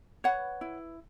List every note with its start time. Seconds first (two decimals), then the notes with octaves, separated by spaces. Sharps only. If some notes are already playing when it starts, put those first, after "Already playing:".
0.24 B4 C#5 F#5
0.61 E4